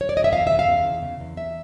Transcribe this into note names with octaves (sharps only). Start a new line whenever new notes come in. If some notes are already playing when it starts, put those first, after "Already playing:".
C#5
D5
D#5
E5
E2 F5
C#3 E5
F5
E2
E2
C#3
E2
E2 E5